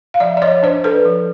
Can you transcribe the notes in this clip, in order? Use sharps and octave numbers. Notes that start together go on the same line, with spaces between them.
F5
F3 D5 E5
D5
F3 C#5 D#5
D4 C5 D5
D4 A4 B4
F3